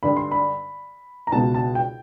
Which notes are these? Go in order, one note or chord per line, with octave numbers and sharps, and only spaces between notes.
G2 D3 B5
C6
B5
A#5
C#2 B2 A5
A5
G5